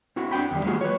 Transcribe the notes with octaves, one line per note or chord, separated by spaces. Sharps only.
C4 E4 F#4
D4 F#5 G5 B5
E2 D#3 G3
F#3 G#3 A#3 F4 F#4 G#4
B4 C#5